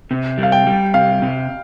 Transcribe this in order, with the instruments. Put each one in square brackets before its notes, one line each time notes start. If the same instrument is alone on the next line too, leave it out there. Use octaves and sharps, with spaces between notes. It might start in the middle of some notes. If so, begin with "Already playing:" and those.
[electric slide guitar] C3
G3
[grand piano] F5
G5
[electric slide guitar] G3
[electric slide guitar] C3 [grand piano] F5
[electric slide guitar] C3